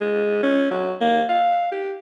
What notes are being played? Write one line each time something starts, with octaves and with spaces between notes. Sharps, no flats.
G#3
C#4
F#3
A#3
F5
G4